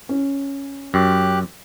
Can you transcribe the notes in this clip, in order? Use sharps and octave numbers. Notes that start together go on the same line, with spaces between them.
C#4
F#2 G4 F#6